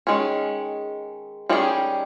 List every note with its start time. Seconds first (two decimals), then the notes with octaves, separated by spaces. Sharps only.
0.07 D#3 G#3 C#4
1.49 D#3 G3 C#4 G#4